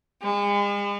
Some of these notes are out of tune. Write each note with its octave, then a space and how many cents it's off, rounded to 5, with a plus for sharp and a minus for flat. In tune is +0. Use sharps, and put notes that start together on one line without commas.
G#3 -40